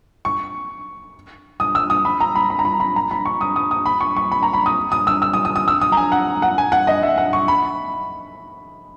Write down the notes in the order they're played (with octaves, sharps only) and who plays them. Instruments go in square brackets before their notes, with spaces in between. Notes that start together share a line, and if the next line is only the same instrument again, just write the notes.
[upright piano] C#6
D#6
E6
D#6
B5
A#5
B5
B5
A#5
B5
B5
A#5
B5
C#6
D#6
D#6
D#6
B5
C#6
C#6
B5
A#5
B5
D#6
D#6
E6
E6
D#6
D#6
D#6
E6
D#6
A#5
G#5
F#5
F#5
G#5
F#5
D#5
E5
F#5
C#6
B5